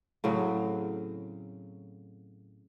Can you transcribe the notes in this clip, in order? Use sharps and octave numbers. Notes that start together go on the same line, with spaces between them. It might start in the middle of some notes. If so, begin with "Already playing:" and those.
A2 C#3 F#3 C4